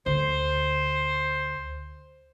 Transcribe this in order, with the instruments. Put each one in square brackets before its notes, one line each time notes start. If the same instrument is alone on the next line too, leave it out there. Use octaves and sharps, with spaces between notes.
[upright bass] D2 [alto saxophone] C5